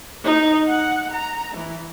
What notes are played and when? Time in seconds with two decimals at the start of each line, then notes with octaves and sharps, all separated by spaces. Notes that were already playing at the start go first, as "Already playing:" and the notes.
0.24 D#4
0.70 F#5
1.12 A#5
1.53 E3